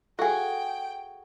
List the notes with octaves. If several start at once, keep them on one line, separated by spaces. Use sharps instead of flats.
F#4 G#4 A4 F5 G5 G#5